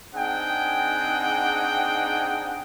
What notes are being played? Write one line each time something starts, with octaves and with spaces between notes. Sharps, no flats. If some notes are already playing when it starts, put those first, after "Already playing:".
C4 D4 D#4 G#4 F#5 G5